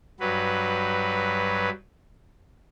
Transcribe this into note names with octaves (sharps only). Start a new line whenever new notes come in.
G2 F#3 B4